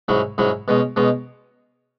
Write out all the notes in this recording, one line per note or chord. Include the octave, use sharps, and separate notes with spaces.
G#2 F#3 C#4 E4
G#2 F#3 C#4 E4
B2 G#3 C#4
B2 G#3 C#4